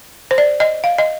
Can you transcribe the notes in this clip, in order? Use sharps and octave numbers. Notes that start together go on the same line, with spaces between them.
C5
D5
D#5
F5
D#5